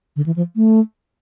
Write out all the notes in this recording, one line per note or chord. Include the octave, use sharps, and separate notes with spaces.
D3
E3
F3
A3